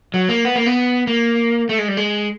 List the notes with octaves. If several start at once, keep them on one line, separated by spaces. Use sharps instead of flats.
F#3
A#3
B3
A#3
B3
A#3
A3
G#3
G3
G#3